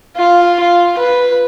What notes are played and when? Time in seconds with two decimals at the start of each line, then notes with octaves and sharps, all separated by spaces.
0.16 F4
0.60 F4
0.98 B4